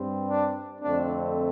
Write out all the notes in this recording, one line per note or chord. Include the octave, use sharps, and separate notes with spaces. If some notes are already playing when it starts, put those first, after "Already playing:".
Already playing: G2 G3 C4
D4
F2 D3 A3 C4 D4